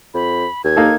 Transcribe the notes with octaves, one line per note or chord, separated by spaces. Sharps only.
F2 B5
D#2 G#6
A#3 D#4 A4